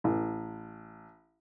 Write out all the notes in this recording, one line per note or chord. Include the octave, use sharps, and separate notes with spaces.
A1